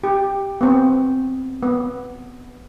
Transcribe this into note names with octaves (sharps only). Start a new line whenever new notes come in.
G4
B3 C4
B3